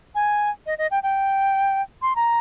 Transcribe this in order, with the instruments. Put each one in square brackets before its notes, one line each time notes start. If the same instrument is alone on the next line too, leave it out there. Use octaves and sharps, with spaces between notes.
[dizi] G#5
D#5
D#5
G5
G5
C6
A#5